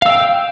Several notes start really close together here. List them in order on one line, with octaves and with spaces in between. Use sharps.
F5 E6 G5